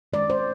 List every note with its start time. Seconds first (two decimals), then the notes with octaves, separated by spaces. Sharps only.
0.13 D#3 G#3 C#4 D5
0.30 C5